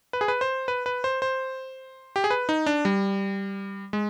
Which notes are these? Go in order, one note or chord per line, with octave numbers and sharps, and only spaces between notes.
B4
G#4
B4
C5
B4
B4
C5
C5
G4
G#4
B4
D#4
D4
G3
G#3